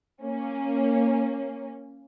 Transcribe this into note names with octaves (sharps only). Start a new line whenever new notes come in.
A#3 C#4